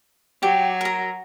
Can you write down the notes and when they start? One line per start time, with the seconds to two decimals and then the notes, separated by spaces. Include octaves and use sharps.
0.43 F#3 G4
0.81 A#4 A#5